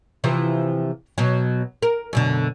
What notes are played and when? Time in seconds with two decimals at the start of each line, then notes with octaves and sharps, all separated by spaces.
0.24 C3 E3 F3
1.18 B2 F#3
1.82 A#4
2.13 F#2 B2 D3